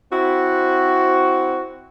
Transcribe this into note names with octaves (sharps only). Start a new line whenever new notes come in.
C4 E4 F#4